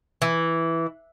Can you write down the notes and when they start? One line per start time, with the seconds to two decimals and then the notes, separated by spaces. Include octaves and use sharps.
0.22 E3